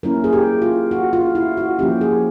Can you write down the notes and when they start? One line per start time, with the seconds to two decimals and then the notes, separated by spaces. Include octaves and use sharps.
0.03 F#3 A#3 C#4 E4 A#4
0.24 G#4
0.33 G4
0.62 F4
0.91 F#4
1.13 F4
1.35 E4
1.57 F#4
1.78 F3 A#3 C#4 G4
2.01 G#4